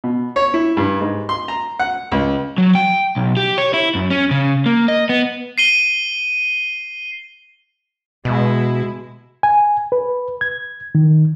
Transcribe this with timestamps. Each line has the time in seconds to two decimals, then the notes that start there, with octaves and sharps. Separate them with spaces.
0.04 B2
0.36 C#5
0.54 E4
0.77 G2
1.01 G#2
1.29 C6
1.48 A#5
1.79 F#5
2.12 C#2
2.58 F#3
2.75 G5
3.16 B1
3.37 G4
3.58 C#5
3.74 E4
3.95 F#2
4.10 C#4
4.31 C#3
4.66 A#3
4.88 D#5
5.09 B3
5.58 C7 D#7 G7
8.25 B2 G#3 E4
9.43 G#5
9.92 B4
10.41 G#6
10.95 D#3